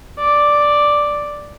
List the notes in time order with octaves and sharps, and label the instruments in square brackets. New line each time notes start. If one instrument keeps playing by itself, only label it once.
[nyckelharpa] D5